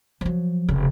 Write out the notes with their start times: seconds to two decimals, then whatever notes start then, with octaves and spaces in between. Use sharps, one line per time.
0.21 F3 F#3
0.69 F1 C#3